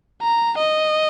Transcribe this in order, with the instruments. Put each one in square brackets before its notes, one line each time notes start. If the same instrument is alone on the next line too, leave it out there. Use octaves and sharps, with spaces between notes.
[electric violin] A#5
D#5